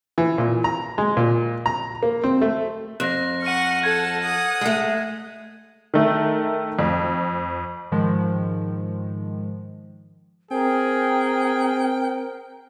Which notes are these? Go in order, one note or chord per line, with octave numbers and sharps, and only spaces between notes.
E3
A#2
A#5
G#3
A#2
A#5
A#3
C4
A3
F2 F#6 A#6
F#5 C#6 F6 D#7
A4 F#5 A5 G#6
F#5 D#6
G#3 A3
D#3 A3 A#4
F2
G#2 D#3 F3 G#3
C4 G#4 A#4 G5